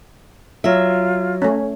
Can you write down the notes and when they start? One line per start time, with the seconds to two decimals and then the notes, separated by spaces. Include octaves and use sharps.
0.64 F#3 F4 E5
1.42 A3 C#4